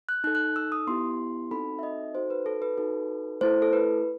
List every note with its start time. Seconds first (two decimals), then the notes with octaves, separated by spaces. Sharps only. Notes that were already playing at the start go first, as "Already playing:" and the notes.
0.09 F#6
0.24 D#4 F#6
0.27 A4
0.35 F#6
0.56 E6
0.72 D#6
0.87 B3 E4 G4 C6
1.51 C4 D#4 F#4 A4 B5
1.79 E5
1.83 D#5
2.14 D#4 F#4 A4 C5
2.30 B4
2.46 A4
2.62 B4
2.78 D#4 F#4 A4
3.41 A3 E4 A4 C5
3.62 A4
3.73 B4